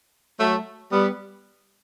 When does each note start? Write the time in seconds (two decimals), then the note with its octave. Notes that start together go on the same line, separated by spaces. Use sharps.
0.40 F#3 A3
0.92 G3 B3